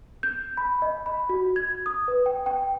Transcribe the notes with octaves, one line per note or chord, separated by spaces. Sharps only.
G6
B5
D#5
B5
F#4
G#6
D#6
B4
G5
G5